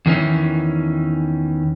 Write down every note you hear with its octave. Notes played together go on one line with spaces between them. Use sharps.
E2 D#3 E3 C#4